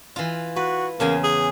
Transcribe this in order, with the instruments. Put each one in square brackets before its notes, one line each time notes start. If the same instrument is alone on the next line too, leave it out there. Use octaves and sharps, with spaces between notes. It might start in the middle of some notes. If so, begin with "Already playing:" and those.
[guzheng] E3 F4
[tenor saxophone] F#4 [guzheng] B4
[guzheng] E2 C#3 G#5 [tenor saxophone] A#3
[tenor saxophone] G#4